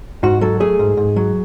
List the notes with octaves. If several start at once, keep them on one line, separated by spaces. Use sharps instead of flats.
G#2 F#4
F#3 A4
A3 G#4
G#2
G#2
F#3